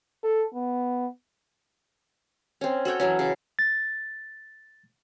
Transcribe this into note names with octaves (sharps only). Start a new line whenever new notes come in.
A4
B3
C4 C#4
F#4 A4 C#5 G5
E3 F#3 C#4
C#3
A6